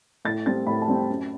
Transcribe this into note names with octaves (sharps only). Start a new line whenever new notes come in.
A2 A6
G3 C4 A6
A2 B5
A5
G3 C4
G5
F#2